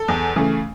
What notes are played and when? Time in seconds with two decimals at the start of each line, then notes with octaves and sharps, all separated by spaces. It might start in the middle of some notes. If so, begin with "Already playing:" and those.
Already playing: A4
0.08 E2
0.36 C#3 E3 A3